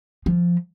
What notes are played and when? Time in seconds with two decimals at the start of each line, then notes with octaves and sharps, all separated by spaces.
0.26 F3